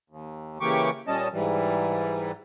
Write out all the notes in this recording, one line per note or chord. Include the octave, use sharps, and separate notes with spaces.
D#2
C#3 E3 A#3 G4 C#6 D6
A#2 G3 C#4 D#5 A5
G#2 E3 G3